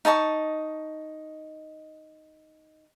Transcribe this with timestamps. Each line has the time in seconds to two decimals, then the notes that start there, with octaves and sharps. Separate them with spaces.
0.05 D#4 D#5 A5 C#6